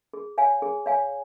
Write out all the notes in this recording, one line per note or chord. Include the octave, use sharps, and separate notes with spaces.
G#4
C#5 F5 G#5
G#4
C#5 F5 G#5